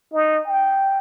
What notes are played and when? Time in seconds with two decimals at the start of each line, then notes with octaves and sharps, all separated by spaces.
0.14 D#4
0.47 G5